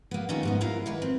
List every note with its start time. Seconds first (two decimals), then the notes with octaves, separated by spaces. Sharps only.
0.11 A#3 B3
0.29 D#3 G3 A3 C#4 D#4 F4
0.43 G#2 B3 D#4
0.61 G#2 E4 F4 A#4 F5
0.86 D#3 E3 B4
1.02 C4